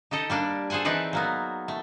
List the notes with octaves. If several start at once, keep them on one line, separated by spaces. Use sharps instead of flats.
D#4 G4 A4 D#5
G3 A#3 D4
G#4 A4 C5 F#5 G#5
E3 C4 D#4 B4 D5
F#3 A#3 B3
A3